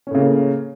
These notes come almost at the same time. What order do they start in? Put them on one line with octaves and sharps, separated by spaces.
C#4 A2 C#3 A#3